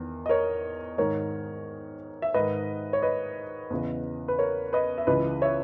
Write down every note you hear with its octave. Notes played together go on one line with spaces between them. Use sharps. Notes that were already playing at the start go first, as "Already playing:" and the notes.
Already playing: E2 D#3
D#5
A#4 C#5
G#2 D#3 A#4 C#5
E5
G#2 D#3 B4 D#5
C#5
B4 D#5
E2 C#3 E3
B4
A#4 C#5
B4 D#5
E5
C#2 C#3 E3 B4 D#5
C#5 E5